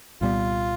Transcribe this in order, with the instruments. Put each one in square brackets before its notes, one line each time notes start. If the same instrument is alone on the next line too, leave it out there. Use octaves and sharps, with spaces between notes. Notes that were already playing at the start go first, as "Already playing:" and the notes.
[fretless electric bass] C2 A#2 G3 B3 [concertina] F4